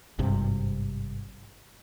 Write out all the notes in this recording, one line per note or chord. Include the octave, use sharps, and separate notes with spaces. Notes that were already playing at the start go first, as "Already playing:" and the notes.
G#1 G2 C3